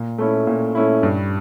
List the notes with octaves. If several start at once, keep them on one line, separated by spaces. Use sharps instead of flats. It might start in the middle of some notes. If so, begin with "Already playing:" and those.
Already playing: A#2
A3 C#4 E4
A#2
A3 C#4 E4
G2